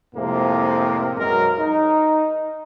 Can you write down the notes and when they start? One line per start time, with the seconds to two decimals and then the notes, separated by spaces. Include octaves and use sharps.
0.15 F2 A2 C3 F3 G#3 A#3
1.17 B1 F#2 F#3 G#3 A#4
1.58 D#4